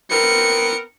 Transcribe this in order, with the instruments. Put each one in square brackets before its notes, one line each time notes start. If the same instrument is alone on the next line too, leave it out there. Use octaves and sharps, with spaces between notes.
[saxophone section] B3 C4 A#4 [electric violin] C#7